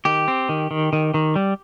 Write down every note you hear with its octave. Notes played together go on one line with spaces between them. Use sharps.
D#3 G4
C4
D#3
D#3
D#3
D#3
G3